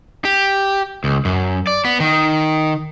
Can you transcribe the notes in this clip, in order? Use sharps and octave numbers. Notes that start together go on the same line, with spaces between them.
G4
C#2
F#2
D5
B3
D#3